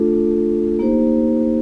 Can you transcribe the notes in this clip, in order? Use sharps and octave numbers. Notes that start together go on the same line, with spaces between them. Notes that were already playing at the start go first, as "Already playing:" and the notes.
Already playing: A3 D4 F4 A4
A#3 D#4 G4 C5